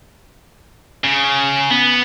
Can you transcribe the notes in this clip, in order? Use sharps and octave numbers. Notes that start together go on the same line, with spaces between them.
C#3
B3